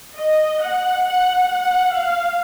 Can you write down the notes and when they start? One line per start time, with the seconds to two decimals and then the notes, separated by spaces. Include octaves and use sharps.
0.17 D#5
0.61 F#5
1.05 F#5
1.48 F#5
1.93 F5